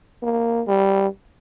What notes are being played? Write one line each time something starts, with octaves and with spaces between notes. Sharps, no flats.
A#3
G3